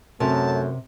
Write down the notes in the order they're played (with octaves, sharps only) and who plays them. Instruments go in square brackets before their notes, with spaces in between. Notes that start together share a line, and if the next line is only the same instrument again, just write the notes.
[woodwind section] F#2 [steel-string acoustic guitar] C3 [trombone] A3 [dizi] A5